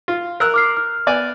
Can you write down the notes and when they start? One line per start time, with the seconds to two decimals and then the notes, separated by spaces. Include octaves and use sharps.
0.08 F4
0.40 A#4 E6 F#6
0.54 D6 F6 C7
0.77 F6
1.07 B3 D5 G#5